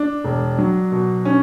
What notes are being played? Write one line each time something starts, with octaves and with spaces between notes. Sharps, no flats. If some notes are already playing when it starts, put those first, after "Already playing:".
Already playing: D4
E1
F#3
B2
C#4